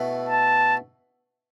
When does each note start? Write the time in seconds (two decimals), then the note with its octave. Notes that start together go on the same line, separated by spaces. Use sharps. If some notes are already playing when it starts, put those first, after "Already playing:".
Already playing: B2 A3 E4 B4
0.29 A5